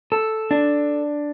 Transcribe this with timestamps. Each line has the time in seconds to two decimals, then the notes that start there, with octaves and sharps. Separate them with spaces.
0.12 A4
0.51 D4